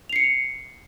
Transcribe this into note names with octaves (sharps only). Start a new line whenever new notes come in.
C7 C#7 F7